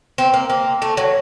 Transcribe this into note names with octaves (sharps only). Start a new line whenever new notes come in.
C4
A#3
A#3
A3
F#3